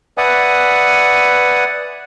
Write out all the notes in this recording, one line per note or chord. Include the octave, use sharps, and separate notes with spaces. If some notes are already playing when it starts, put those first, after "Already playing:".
B4 D5 E5 F#5 G#5 D#6